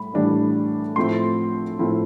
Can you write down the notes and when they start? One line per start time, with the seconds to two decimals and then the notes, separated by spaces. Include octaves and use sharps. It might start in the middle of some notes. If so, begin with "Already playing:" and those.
Already playing: A2 G3 B5
0.14 A2 E3 G3 D4
0.96 A2 F3 C4 E4 C6
1.79 A2 F3 C4 E4